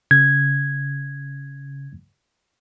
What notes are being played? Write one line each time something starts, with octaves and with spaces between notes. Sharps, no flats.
C#3 G#6